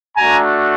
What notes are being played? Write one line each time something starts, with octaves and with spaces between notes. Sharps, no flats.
A3 D4 F#4 G#5 A#5